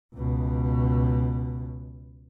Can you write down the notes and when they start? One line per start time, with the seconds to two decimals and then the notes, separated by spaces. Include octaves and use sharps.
0.15 C#2 B2